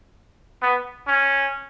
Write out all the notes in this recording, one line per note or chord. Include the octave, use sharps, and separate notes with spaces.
B3
C#4